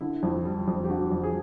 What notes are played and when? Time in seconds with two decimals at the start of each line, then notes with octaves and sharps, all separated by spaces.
0.01 D3 E4
0.23 F2
0.45 G3
0.68 F2
0.85 G4
0.89 D3 F#4
1.12 F2
1.23 G#4